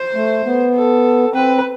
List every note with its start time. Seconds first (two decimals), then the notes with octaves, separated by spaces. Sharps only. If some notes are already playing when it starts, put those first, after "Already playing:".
Already playing: C5
0.15 A3
0.45 B3
0.74 A4
1.34 C4 B4